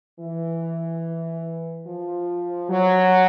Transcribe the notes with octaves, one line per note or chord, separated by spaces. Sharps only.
E3
F3
F#3